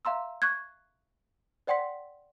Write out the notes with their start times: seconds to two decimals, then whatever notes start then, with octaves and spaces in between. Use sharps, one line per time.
0.05 E5 F5 A#5 C6 E6
0.42 C#6 F#6 G#6
1.67 C5 D5 F#5 G5 C6 B6